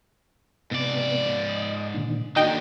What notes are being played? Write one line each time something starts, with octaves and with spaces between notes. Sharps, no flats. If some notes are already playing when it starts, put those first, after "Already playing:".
G#2 C3 B3 D5
D#5
A#2 D3 D#3
D#2 D3 D#4 F#4 G5